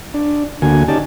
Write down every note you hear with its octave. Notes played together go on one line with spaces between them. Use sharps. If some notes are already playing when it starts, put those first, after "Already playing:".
D4
D2 D3 A#3 F#4 G#5
C#4 D#4 G4 D5 A5